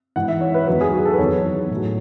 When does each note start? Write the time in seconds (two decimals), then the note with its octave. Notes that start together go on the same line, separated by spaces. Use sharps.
0.16 G#2 E3 F#5
0.28 E5
0.41 C#5
0.54 B4
0.67 E2 D#3 F#3 B4
0.81 G#4
0.93 F#4
1.05 A4
1.13 B4
1.18 E2 D#3 F#3 C#5
1.70 A2 F#3